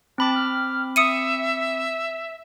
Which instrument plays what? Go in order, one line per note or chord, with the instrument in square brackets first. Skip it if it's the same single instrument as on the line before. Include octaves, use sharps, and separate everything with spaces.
[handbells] C4 B5 D6 [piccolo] A5
[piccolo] F6
[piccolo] E5 [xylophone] D#6 C#7 D#7